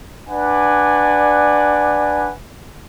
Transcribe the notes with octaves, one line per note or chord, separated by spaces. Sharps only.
D4 B4 D5 F#5 G#5